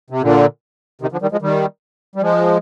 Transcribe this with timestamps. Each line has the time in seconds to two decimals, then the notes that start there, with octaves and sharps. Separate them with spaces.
0.10 C3
0.22 A#2 D3
1.01 C3 D#3
1.12 D3 F3
1.22 D#3 G3
1.32 F3 G#3
1.42 D#3 G3
2.16 G3
2.21 F3 G#3